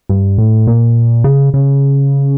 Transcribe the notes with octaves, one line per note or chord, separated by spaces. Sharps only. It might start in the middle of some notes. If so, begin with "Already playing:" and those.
G2
A2
A#2
C#3
C#3